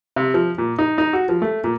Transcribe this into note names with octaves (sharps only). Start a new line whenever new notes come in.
C3
F3
A#2
D#4
D#4
F#4
F3
A3
A#2